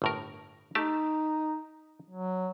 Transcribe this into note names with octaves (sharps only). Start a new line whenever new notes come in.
G1 A2 A#4
A3 D#4 G4 A5
F#3